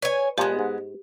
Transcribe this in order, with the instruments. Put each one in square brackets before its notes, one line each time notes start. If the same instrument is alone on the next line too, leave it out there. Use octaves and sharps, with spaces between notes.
[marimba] B4 [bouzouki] C#5 G#5
[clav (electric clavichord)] A#2 F3 A#3 [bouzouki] G#3 B3 [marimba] G4
[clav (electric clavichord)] G#2